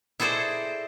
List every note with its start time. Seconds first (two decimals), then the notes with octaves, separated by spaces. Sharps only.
0.20 E4 G#4 A4 C5 D5 D#5